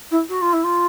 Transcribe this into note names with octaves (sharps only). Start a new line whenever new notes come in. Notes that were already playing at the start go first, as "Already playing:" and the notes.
E4
F#4
F4
E4
F4